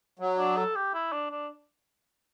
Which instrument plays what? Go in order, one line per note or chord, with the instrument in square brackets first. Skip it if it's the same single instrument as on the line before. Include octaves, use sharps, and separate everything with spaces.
[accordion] F#3
[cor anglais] D4
A4
G4
E4
D4
D4